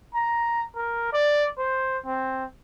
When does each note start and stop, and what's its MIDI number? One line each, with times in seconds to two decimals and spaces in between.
0.14 0.65 82
0.75 1.09 70
1.13 1.47 74
1.58 1.98 72
2.05 2.44 60